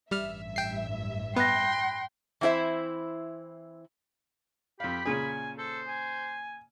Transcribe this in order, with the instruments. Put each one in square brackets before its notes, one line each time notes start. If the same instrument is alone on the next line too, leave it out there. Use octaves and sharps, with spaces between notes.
[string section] A1 G2 E5 [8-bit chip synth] G3 F6
[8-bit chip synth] G5 C7
[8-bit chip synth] B3 [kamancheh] G5 C6 [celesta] B5 F#6 A#6
[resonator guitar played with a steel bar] E3 C4 E4 C5 E5
[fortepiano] F2 F5 [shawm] G4 [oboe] B5
[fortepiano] A#2 C#3 G#4 [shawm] G#5
[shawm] A4 [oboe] C5
[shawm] G#5